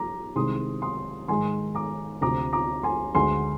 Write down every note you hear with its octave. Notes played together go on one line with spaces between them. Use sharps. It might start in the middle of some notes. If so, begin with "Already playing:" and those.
Already playing: G3 A#5 D6
C2 C3 D#3 G#3 C6 D#6
C6 D#6
G#2 D#3 G#3 G#5 C6
A#5 D6
D2 C3 F3 A#5 D6
A#5 D6
G#5 C6
D2 D3 G#3 G#5 C6